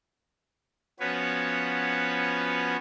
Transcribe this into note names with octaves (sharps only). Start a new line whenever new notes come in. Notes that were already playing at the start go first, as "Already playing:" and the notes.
F3 B3 C#4 F#4 B4 C#5